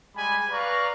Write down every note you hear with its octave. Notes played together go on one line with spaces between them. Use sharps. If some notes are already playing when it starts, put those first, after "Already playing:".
G3 G#3 G#5 B5
B4 D5 F5 A#5 C#6